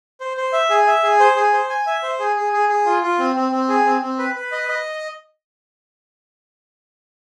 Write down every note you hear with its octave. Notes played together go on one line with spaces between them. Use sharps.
C5
C5
E5
G#4
E5
G#4
C5
G#4
C5
G#5
E5
C5
G#4
G#4
G#4
G#4
F4
F4
C4
C4
C4
G#4
C4
C4
B4
B4
D#5
D#5